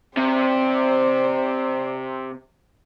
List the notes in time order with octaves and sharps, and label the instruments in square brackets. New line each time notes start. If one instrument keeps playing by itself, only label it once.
[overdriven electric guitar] C3 [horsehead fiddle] C5 D5